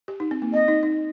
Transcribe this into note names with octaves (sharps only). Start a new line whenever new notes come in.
G4
D#4
C4
A#3
C4 D#5
D#4
D#4